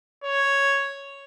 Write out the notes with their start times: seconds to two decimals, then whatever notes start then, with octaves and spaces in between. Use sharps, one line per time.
0.24 C#5